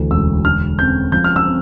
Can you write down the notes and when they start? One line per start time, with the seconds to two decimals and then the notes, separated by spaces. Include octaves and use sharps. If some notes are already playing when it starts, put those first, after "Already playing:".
Already playing: D2 E3
0.11 E1 E6
0.45 D3 F6
0.79 C4 G6
1.12 F3 G6
1.24 F6
1.36 E6
1.46 C4